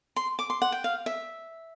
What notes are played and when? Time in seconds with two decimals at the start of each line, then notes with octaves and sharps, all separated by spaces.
0.16 C6
0.39 D6
0.50 C6
0.62 F#5
0.72 G5
0.84 F5
1.06 E5